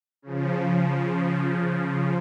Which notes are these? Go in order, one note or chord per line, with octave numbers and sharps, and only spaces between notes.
C#3 F3